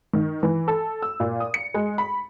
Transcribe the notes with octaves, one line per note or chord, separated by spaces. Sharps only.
D#3
E3
A4
E6
A#2
D#6
C#7
G#3
B5